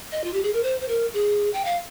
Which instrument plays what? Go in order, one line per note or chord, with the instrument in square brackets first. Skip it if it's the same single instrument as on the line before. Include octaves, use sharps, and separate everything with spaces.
[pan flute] D#5
F4
G4
G#4
A#4
C5
C5
A#4
G#4
G5
F5